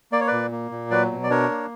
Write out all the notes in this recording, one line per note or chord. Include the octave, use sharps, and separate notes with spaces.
A#3 D5
C#5
A#2 B4 D5
A#3
A#2
F#3 B4 D5
B2
D5
D4 A#4 C#5
A#3